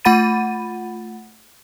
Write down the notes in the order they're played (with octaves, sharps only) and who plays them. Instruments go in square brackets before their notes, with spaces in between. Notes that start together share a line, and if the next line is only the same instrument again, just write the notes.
[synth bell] A3 F4 F#5 B5 A6 D#7